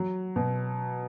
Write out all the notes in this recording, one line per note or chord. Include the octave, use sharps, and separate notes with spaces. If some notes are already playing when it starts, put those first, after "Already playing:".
Already playing: F#3
B2